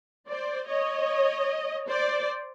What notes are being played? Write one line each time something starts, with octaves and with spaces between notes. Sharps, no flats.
C5 D5
C#5 D#5
C5 D5